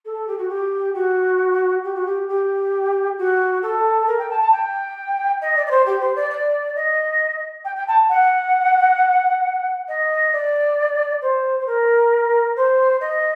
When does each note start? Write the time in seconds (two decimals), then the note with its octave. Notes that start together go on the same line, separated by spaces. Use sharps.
0.05 A4
0.27 G4
0.38 F#4
0.49 G4
0.94 F#4
1.84 G4
1.94 F#4
2.06 G4
2.28 G4
3.18 F#4
3.62 A4
4.07 A#4
4.19 G5
4.30 A5
4.40 A5
4.52 G5
5.41 D#5
5.56 D5
5.66 D5
5.71 C5
5.86 G4
6.00 C5
6.15 D5
6.30 D5
6.75 D#5
7.65 G5
7.76 G5
7.87 A5
8.09 F#5
9.88 D#5
10.32 D5
11.21 C5
11.60 C5
11.66 A#4
12.56 C5
13.00 D#5